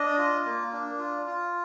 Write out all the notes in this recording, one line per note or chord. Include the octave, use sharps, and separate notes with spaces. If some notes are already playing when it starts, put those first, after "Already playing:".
Already playing: D4 D#5
F4
A#3
D4
F4
F4